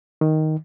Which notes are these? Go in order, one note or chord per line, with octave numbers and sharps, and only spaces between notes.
D#3